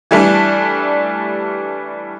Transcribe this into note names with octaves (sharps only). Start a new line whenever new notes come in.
E3 G3 A3 D4